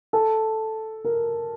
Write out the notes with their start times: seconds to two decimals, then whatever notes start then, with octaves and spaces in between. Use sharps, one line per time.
0.13 A4
1.05 A#4